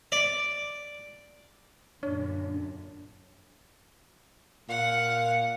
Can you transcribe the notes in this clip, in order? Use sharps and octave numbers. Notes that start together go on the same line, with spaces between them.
D5
F#2 A#2 D3 D4 C#5
A#2 F5 F#5